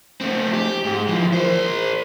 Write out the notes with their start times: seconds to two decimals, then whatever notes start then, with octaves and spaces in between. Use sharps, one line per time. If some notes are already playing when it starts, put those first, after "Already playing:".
0.21 A3 C4
0.53 G4
0.85 G#2
1.08 E3 F3
1.33 A#4 C5